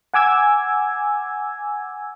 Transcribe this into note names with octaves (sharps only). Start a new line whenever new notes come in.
F#5 G#5 D6 E6 G#6